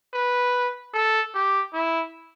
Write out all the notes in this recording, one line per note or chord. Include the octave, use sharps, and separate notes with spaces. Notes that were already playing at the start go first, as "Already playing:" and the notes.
B4
A4
G4
E4